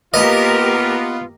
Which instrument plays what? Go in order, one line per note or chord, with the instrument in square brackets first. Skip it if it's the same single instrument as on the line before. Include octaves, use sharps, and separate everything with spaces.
[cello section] A#3 G4 A#4 [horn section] B3 F4 [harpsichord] D#5